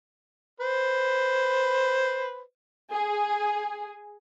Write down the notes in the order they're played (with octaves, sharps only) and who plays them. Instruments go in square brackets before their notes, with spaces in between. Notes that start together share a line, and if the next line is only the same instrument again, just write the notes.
[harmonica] B4 C5
[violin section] G#4